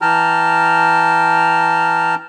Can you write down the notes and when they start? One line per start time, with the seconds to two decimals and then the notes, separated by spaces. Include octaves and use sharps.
0.01 E3 G5 A5 A#5 F6